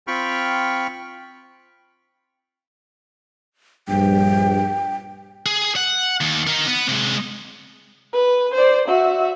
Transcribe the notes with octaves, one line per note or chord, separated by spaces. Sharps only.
C4 F4 G5 B5 C#6 F6
A#1 G2 G5
G#4
F#5
D#2
D#4 A#4
B3
C3 G#3
B4
C5 D5
F#4 E5